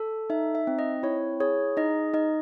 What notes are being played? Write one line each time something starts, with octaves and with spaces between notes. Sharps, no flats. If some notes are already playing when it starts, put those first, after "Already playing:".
Already playing: A4
D#4 E5
E5
C4
D#5
E4 C#5
G#4 C#5
D#4 D#5
D#4 D#5